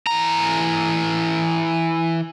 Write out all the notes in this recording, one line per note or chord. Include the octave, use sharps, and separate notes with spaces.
E3 A#5